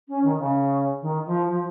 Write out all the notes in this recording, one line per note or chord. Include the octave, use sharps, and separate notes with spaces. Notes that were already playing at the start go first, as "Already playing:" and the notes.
C#4
D#3
C#3
D#3
F3
F3